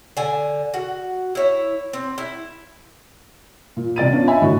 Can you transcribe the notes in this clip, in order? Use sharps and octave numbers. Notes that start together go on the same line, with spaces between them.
D3 G#5
F#4
E4 C#5
C4
E4
A#2
C3 D5 A6 D#7
B3 C#4 D4 F4
D#5 E5 G#5 B5
A2 D3 A3 E4 F#4